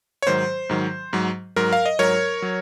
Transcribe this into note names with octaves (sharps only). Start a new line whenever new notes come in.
C#5
G#2 D#3 F#3 C5
G#2 D#3 F#3
G#2 F#3
G#2 F#3 A#4
F5
D#5
G#2 F#3 A#4 C#5
F#3